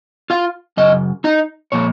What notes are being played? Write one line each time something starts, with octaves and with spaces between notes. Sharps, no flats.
F4 F5
F#2 C#3 D#5
D#4 D#5
A#2 F3 A#3 C#5